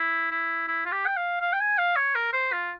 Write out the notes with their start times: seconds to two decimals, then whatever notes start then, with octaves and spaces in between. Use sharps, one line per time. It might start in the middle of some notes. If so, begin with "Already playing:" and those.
Already playing: E4
0.31 E4
0.68 E4
0.86 F4
0.92 G4
1.06 G5
1.17 F5
1.41 F5
1.53 G5
1.60 G#5
1.78 F5
1.96 C#5
2.15 A#4
2.33 C5
2.52 F4